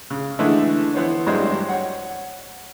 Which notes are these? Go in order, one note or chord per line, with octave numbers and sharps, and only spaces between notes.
C#3
D3 E3 G#3 A3
E3 B3 C5 C#5
A1 G2 F#3 G#3 D4 C5
C#5 F#5